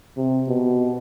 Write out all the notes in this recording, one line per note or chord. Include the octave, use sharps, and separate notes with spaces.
C3
B2